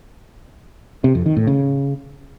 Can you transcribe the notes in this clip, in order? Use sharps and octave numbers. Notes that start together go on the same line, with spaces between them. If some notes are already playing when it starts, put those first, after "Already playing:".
C3
F2
D#3
A2
C#3